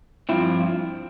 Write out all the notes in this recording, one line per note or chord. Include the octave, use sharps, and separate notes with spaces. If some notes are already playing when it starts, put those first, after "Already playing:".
G2 F3 C4 E4